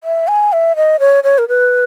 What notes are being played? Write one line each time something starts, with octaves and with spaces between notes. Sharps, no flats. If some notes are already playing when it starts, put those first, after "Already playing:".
E5
G#5
E5
D#5
C#5
C#5
A#4
B4